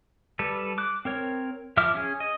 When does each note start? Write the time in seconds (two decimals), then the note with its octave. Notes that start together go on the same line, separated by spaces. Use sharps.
0.39 G3 A4 B4
0.78 D6 F#6
1.05 C4 A#4 C#5
1.77 F3 E4 E5 D6 F6
1.94 C#4 G#4
2.20 D#5